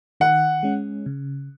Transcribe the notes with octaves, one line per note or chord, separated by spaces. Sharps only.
D#3 F#5
G#3 C#4
C#3